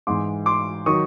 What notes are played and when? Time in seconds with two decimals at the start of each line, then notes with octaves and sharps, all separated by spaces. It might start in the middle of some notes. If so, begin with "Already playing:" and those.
0.07 G#2 E3 C6 D6
0.46 C6 D6
0.86 D#3 F#3 C#6 D#6